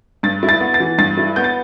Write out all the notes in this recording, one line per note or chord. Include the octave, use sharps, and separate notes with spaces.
G2 A6
E4
A6
B3
A6
E3
G2 A6
E4
B3 G6
A6